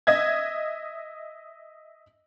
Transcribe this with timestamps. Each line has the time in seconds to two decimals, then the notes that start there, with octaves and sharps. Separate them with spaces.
0.07 D#5 E5 G#6